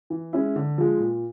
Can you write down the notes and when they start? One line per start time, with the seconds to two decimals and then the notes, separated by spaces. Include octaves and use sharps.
0.10 E3
0.33 G#3 C#4 E4
0.56 D3
0.78 F3 G#3
1.00 A#2